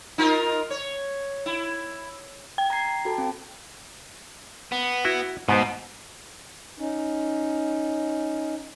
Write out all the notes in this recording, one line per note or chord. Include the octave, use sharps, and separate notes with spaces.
D#4 F4 A#4
C#5
E4
G5
A#5 G#6 C7
F#4 A4 A5
C4
B3
E4 F#4
G#2 B2 B3 C5
C#4 D#4